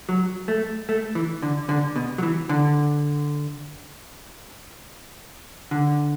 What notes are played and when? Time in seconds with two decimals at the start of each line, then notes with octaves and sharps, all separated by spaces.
0.09 F#3
0.48 A3
0.89 A3
1.15 E3
1.42 D3
1.69 D3
1.96 B2
2.18 F#3
2.23 E3
2.49 D3
5.71 D3